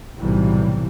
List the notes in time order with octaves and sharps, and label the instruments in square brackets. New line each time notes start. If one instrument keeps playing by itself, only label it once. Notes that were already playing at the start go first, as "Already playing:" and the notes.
[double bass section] B1 A2 C3 E3 F#3 G3